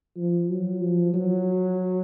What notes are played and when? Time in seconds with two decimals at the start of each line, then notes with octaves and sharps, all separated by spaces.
0.17 F3
0.49 F#3
0.82 F3
1.14 F#3